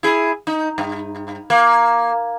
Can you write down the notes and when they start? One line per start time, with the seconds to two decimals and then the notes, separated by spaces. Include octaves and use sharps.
0.03 E4 G#4
0.47 D#4
0.78 G2
1.50 A#3